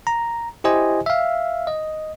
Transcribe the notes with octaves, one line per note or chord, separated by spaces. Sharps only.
A#5
E4 G4 C5 D#5 G#5
E5 F5
D#5